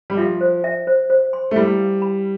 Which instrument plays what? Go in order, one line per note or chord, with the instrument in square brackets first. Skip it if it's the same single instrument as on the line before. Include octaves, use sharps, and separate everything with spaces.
[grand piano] G3
[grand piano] F3 [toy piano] E5
[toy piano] C5
E5
C5
C5
C6
[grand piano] A3
[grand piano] G3 [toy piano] E4
[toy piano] F5
B5